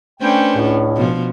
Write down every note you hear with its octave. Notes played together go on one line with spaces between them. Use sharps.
A3 C#4 D4 B4 C5 G5
C#2 A2
B2 F3